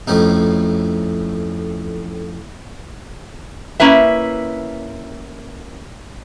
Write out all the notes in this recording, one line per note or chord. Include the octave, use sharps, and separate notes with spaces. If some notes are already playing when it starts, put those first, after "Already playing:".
F2 A2 C#4 D#4
A#3 C#4 E4 B4 E5